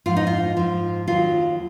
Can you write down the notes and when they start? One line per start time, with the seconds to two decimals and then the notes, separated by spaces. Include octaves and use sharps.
0.06 G#2 F3 F4
0.17 D#4
0.27 F4
0.57 G#2 F3
1.08 D#2 D#3 F#3 F4